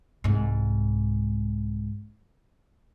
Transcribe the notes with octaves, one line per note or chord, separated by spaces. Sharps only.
C2 G#2